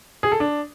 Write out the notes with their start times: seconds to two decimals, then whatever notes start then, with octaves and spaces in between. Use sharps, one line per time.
0.23 G#4
0.32 A4
0.40 D4